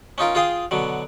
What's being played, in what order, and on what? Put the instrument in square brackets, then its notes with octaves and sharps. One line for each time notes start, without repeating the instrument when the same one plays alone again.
[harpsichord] C#4 D#4 F4 A#4
F4 G#4 F5 G5 D#6
B2 D3 F#3